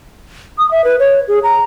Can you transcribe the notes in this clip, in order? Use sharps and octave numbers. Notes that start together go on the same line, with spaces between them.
D#6
E5
B4
C#5
G#4
A#5